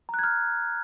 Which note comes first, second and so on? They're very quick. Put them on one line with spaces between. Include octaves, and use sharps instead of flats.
A#5 F#6 G#6 F6